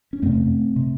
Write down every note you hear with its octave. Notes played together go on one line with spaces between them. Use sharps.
C#4
F2 C3 A3 C4
C3